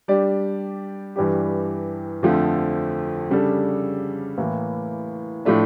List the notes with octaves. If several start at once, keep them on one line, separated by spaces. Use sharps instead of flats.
G3 D4 G4 D5
G2 E3 G3 D4 G4
F2 D3 F3 A3
C#3 G3 D4 A4
A2 E3 A#3
A2 F3 A3 D4